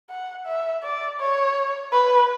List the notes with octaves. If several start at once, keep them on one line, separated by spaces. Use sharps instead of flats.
F#5
E5
D5
C#5
B4